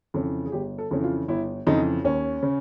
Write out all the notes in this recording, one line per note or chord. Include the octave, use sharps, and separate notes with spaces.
F2 C#3 E3
G#4
G1 G4
A4
F2 C#3 E3
F4
G1 E4
F2 C#3 E3 D#4
D#2 C#4
C#3